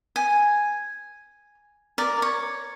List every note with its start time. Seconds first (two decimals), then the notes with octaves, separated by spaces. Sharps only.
0.16 G#5
1.98 A#4 D5
2.22 C#5